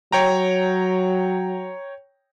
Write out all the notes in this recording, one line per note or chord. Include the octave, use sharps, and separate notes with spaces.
F#3 C#5 G5 A#5